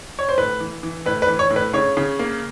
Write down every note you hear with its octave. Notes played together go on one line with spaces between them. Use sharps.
C#5
C5
A2 B4
E3
E3
A2 B4
B4
E3
C#5
A2
B4
C#3 C#5
C#3
A#3